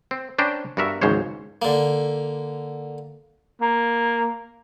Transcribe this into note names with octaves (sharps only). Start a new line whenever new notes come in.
C4
C#4 D4 B4 C5 G5 A#5
G2 B3 F#4 A#4 E5
G#1 C#2 G#2 F3 C5 C#5
D3 A#3
A#3